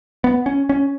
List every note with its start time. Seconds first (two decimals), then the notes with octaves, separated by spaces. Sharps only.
0.24 B3
0.46 C#4
0.69 C#4